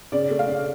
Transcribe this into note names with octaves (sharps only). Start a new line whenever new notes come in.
C#3 D5
A3
F5
C#3